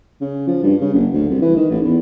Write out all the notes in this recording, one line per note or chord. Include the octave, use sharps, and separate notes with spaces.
C#3
F3
G2
C#3
F#1
D2
C2
E3
D#3
A1
E2